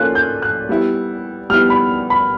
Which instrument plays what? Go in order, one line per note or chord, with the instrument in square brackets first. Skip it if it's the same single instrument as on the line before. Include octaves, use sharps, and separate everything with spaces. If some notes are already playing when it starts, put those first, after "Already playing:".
Already playing: [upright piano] A#3 C#4 F4 A4 [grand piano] F#6
[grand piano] G6
F#6
[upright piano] G3 B3 E4
[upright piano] G3 B3 E4 [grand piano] F6
[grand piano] B5
B5